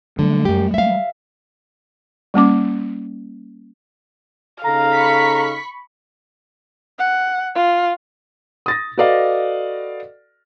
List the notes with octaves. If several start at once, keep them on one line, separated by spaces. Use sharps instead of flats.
D3 F#3 G3 A3
F#2 G4
E5 F5
G3 A#3 C#4 D6
C#3 D#4 A4 F5 A#5
B5 C#6 B6
F#5
F4
D#6 A6 A#6
F#4 A4 B4 D5 D#5 F5